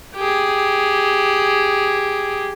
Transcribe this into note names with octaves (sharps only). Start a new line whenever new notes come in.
G4 G#4